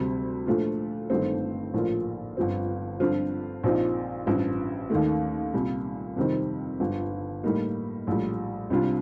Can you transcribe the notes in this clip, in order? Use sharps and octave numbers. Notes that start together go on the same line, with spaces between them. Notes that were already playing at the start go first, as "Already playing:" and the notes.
Already playing: D2 C3 G3
A#2 F3 A3 D4 F4
G1 G2 D#3 A3 C4
A#1 A2 F3 A#3 F4
G1 G2 F3 C4
G2 D3 F3 C4 F4
A#1 A#2 F3 C4 D#4
A1 G2 F3
D#2 D#3 A3
C2 A#2 G3
F2 C3 D#3 G3 C4
G1 G2 F3
A2 G3 A#3 D#4
A#1 A2 G3
C2 C3 G3 D4 F4